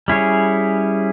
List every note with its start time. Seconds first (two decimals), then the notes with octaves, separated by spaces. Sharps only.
0.08 G3 C#4 E4 G#4 C#5